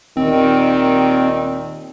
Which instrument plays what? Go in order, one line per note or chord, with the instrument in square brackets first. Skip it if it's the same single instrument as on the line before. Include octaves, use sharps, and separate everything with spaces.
[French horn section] D#2 A#2 D#3 [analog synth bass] C4